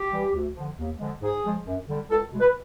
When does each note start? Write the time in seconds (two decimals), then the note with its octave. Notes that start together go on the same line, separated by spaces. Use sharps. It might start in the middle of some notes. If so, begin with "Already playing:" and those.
Already playing: G4
0.12 E3 G3
0.34 D2
0.56 D3 F3
0.79 D#2
0.99 D3 F3 G#3
1.22 G#2 G#4
1.44 F3 G#3
1.66 F#2
1.88 D3 G3
2.10 C#2 A4
2.32 B2 G#3
2.40 B4